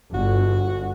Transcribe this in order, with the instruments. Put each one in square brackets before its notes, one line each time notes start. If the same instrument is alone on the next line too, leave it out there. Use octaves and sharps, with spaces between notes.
[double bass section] G1 [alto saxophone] F#4